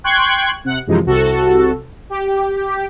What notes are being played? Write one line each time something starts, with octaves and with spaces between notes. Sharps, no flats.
G5 C6 C#6 F#6 G#6
C3 F#5
F#2 C3 E3 F3 G#3 D#4
C2 C3 F#4 A4
G4